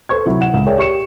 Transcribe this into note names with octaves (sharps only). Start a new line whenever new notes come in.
A4 B4 C5 C#6 G#6
C3 F#3 E4
F#5 E7
C#2
G#4 A#4 C#5 D5 E5 G5
G4 C#6 C#7 E7